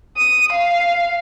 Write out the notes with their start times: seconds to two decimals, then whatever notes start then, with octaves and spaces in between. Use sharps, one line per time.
0.17 D#6
0.53 F5